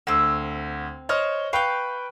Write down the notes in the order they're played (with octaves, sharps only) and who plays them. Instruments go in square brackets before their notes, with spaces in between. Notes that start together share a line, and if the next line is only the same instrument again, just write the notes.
[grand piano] D2 [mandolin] C4 E6
[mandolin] C5 [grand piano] C#5 D#5 F6
[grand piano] B4 G5 C#6 [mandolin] F5 G6